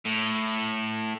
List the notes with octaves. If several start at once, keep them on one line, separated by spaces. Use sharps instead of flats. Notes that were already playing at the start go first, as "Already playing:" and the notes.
A2